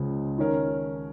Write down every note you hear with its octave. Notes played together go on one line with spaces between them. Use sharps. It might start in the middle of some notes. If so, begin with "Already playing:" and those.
Already playing: C#2 C#3 F3
D#3 C#4 A#4